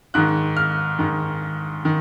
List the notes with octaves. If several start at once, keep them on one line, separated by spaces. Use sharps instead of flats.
G#2 D#3 F#6
F6
G#2 D#3
D#3